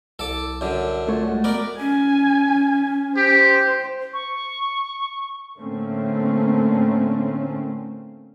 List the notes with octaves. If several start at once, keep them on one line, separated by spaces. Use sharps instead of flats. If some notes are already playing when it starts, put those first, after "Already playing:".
C2 A4 D6
F#2 D3
A3 F4 C#5
G#3 A3 F#4
B3 A#4 D5
C#4 G#5
G4 C5
C#6
A2 D3 A3 A#3 C4 C#4